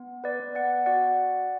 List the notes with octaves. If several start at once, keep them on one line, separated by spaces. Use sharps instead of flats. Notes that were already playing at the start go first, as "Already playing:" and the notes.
Already playing: B3
B4 D5
B3
D5 F#5
F#4 D5 F#5